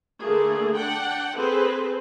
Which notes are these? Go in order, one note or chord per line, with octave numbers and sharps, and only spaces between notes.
D3 A3 A#3 G#4
D4 F#5 G5
C4 G#4 A4 B4 C5